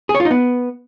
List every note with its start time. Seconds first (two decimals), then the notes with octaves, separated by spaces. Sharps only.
0.09 G#4
0.15 C#5
0.20 F4
0.25 D#4
0.31 B3